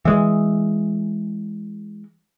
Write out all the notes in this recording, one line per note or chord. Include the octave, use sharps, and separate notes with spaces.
E3 G#3